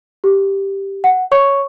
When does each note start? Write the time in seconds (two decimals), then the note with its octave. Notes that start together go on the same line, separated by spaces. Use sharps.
0.24 G4
1.04 F#5
1.32 C#5 C#6